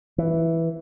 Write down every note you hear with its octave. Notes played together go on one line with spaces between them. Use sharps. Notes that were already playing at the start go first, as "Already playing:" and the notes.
E3